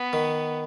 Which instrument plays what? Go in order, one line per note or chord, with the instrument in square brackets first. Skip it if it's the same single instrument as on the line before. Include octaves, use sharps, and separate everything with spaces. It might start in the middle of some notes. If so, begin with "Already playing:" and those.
Already playing: [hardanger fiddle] B3
[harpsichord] D#3